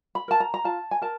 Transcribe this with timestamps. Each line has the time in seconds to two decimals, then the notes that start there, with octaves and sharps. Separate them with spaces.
0.15 B5
0.28 A#4 A5
0.40 A#5
0.54 A#5
0.64 F4 A5
0.91 G#5
1.02 A#4 A5